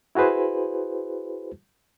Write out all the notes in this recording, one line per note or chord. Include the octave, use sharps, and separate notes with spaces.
E4 F#4 G#4 B4 C5